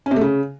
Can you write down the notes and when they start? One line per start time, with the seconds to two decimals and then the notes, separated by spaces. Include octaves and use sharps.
0.06 C#4
0.11 C3
0.16 A3
0.21 C#3